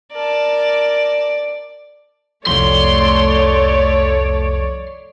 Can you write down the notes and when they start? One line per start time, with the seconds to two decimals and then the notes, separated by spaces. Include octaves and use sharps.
0.12 A#4 D5 A5
2.47 C2 F2 F3 A3 C#5 D5 C6